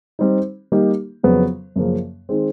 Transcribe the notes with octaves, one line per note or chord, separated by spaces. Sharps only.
G3 C4 D#4
G3 A#3 D#4 G4
F2 C#3 F#3 B3
F#2 C#3 F3 A#3
D#3 G#3 C4